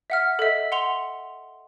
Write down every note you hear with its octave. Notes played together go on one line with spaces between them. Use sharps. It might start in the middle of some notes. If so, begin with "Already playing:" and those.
E5 F#5 F6
A4 D#5 E5
F#5 C6 F7 G7